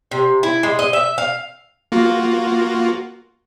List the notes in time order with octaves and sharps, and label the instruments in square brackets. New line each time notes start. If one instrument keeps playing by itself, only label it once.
[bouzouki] C3
E4
G#3
D#5
E5
F5
[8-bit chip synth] A#3 F4 F#4